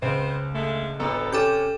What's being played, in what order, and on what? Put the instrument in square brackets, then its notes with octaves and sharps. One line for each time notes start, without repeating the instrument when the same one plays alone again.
[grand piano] C#2 [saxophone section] B3 C4 C5
[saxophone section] D3 G#3 A3
[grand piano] A1 B3 A#5 [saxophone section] D2 A4
[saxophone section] C3 C#4 [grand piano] G4 [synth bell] A4 D6 G6